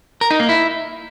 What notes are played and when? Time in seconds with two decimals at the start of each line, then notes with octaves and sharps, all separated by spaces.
0.21 A#4
0.30 D#4
0.40 A#3
0.49 E4